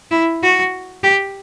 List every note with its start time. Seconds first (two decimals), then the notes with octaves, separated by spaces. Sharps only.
0.11 E4
0.42 F#4
1.03 G4